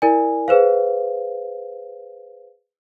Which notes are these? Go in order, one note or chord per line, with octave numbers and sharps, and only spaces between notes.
E4 A#4 D5 G#5
G#4 B4 C5 F5